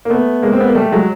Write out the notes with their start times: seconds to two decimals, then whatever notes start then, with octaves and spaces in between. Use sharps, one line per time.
0.05 A#3
0.10 A3 B3
0.43 G#3 A#3
0.53 C4
0.60 B3
0.68 A#3
0.75 G3 A3
0.92 F#3 G#3